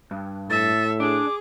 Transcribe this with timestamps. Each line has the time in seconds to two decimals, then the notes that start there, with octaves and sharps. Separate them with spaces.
0.11 G2
0.50 A2 A4 E5 A6
1.00 D4 G#4 D6